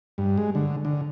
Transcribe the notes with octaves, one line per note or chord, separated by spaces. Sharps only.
G2
G#3
D3
D3